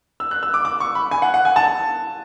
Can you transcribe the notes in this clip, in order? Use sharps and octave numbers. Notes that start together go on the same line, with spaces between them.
E6
F#6
E6
D6
D6
C#6
B5
G#5
F#5
F#5
G#5
A5